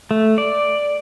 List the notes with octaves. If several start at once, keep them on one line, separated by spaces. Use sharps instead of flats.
A3
D5